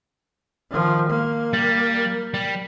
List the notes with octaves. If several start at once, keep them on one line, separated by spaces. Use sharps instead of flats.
D#3 F3
A#3
G3
G3